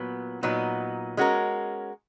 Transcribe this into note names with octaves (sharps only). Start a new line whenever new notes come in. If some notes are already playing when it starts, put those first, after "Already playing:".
Already playing: A#2 F#3 B3
A#2 F#3 B3 D#4
G#3 C#4 F#4 A#4